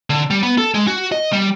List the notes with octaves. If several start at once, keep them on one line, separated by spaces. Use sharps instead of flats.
D3
G3
B3
A4
G#3
F#4
D#5
G3